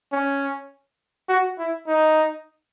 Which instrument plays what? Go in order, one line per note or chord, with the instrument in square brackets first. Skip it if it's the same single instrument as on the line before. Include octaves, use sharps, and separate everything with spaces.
[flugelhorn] C#4
F#4
E4
D#4